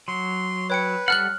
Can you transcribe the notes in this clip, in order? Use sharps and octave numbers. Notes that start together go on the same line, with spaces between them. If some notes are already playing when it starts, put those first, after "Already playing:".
F#3 C6
B4 C#5 G5 C#7
G3 A4 F#5 F6 F#6 F#7